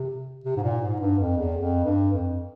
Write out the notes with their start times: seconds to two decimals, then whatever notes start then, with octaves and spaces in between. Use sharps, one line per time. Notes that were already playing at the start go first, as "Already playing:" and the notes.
Already playing: C3
0.44 C3
0.57 G#2
0.63 A#2
0.81 G#2
1.00 G2
1.19 F2
1.38 E2
1.57 F2
1.85 G2
2.13 F2